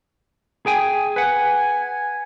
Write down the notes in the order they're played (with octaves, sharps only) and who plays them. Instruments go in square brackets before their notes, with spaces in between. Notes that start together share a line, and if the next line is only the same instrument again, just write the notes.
[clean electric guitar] G#4 G5 G#5
[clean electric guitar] B4 F#5 [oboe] G#5